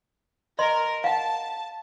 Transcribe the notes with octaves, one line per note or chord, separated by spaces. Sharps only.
A#4 D#5 C6
F5 F#5 A5